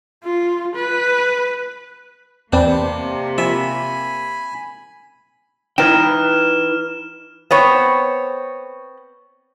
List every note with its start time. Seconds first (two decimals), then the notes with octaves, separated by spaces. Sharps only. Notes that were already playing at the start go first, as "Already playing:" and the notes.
0.24 F4
0.76 B4
2.53 E2 C3 A#3 C4 D4 B4
3.38 F3 E5 G#5 B5
5.78 D#4 E4 B4 G5 F6 E7
7.51 B3 C4 C#5